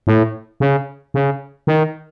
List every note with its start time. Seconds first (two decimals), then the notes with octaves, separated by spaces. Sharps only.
0.07 A2
0.60 C#3
1.14 C#3
1.67 D#3